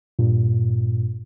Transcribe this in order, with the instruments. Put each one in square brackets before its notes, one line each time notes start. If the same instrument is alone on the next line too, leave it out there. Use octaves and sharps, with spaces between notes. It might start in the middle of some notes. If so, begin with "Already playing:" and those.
[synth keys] G2 A#2